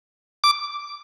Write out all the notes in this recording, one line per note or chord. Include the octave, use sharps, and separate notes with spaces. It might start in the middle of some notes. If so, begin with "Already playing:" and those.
D6